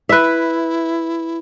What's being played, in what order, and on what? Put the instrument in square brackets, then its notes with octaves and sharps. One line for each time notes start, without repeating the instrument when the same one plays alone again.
[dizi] E4 [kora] B4 E5